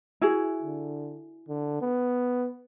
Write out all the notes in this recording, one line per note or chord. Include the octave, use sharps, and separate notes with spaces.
E4 F#4 G#4
D3
D3
B3